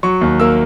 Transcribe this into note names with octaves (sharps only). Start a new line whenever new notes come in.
F#3 C#6
D#2
A#3 E6